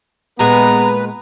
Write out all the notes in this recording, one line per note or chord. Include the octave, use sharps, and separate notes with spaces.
A#2 G#3 B3 G#4 B4 A#5